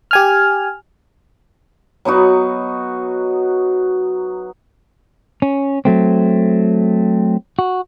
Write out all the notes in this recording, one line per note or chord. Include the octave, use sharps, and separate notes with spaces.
G4 G#5 F6
F#3 B3 D#4 F#4
C#4
F#3 A3 C4
F#4